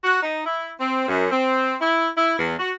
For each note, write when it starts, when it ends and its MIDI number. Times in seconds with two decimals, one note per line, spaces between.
0.04 0.19 66
0.22 0.43 63
0.45 0.71 64
0.79 1.07 60
1.08 1.30 42
1.31 1.75 60
1.80 2.08 64
2.16 2.37 64
2.38 2.53 40
2.59 2.71 66